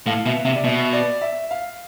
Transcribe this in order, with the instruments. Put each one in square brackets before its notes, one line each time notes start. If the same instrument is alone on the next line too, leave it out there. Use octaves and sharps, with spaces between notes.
[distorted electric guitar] A2 [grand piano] F5
[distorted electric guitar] B2 [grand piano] E5
[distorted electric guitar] C3 [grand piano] E5
[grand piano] D5
[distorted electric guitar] B2 [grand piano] E5
[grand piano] D5
E5
F5